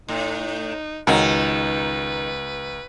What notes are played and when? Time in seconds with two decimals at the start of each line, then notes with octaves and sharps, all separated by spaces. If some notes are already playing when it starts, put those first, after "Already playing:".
0.08 A2 D#4
1.07 C#2 D#3 F#3 C#4 D#4 A#4 B4